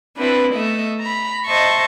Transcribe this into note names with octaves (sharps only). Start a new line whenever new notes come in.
C4 D4 E4 B4
A3 B3 D#5 E5
A#5 B5
C5 D#5 E5 A5 C#6